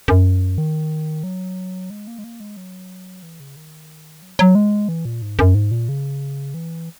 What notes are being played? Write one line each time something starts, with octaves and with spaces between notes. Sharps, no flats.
F#2
D#3
F#3
G#3
A#3
G#3
A#3
G#3
F#3
E3
C#3
D#3
F#3
F#3
G#3
E3
A#2
G#2
F#2
G#2
A#2
C#3
E3